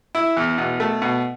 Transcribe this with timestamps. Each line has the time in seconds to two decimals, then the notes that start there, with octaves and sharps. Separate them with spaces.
0.15 E4
0.37 E2
0.58 B2
0.80 A3
1.02 B2